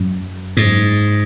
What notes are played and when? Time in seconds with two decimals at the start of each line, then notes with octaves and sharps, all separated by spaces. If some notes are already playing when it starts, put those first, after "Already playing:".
Already playing: F#2
0.57 G#2